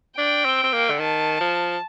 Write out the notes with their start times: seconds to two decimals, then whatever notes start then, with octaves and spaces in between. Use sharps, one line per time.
0.18 D4 G5
0.45 C4
0.64 C4
0.73 A#3
0.90 D3
0.99 D#3 A5
1.41 F3